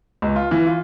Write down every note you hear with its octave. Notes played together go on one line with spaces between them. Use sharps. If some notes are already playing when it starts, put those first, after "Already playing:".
C#2
F4
E3
F4